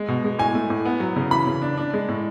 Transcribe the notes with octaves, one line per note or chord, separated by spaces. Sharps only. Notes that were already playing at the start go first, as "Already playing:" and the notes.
Already playing: G#3
B2
G#3
A2 G#5
A3
A2
B3
F#3
C#3
E3 B5
C#3
D4
D4
G#3
A2